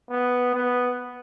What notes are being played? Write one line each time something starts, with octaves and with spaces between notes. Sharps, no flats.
B3
B3